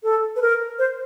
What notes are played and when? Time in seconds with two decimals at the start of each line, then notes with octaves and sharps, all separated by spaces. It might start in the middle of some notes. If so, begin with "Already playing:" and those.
0.03 A4
0.36 B4
0.42 A#4
0.79 C5